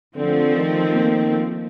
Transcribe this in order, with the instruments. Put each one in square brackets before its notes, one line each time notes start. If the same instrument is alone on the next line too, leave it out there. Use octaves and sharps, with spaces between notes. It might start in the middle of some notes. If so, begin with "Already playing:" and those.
[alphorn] D3 [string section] F3 A3 C4
[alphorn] D#3
[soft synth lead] A#3